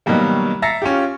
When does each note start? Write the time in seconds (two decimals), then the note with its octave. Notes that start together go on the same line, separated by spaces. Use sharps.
0.06 B2 D#3 F#3 G3 A#3
0.62 E5 A#5 A6 A#6 C7 C#7
0.82 C#4 F4 G4